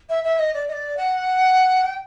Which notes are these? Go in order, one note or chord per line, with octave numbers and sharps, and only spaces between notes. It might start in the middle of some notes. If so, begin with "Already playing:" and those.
E5
E5
D#5
D5
D#5
D5
F#5
G5